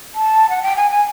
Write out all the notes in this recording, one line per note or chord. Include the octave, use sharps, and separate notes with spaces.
A5
F#5
G5
G#5
G#5